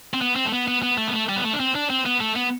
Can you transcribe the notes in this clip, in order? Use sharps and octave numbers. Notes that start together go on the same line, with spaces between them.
C4
B3
C4
A3
B3
B3
B3
A3
B3
A3
G3
B3
A3
D4
C4
D4
C4
B3
A3
B3